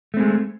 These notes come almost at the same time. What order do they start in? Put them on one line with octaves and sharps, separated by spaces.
A3 C4 G#3